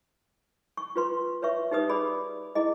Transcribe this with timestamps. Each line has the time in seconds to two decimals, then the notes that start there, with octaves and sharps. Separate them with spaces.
0.77 C#6
0.96 F4 B4 C6
1.42 B4 C#5 E5 C#6
1.71 D#4 G4 B4 D#6
1.89 G#4 D5 B5
2.55 E4 G#4 D#5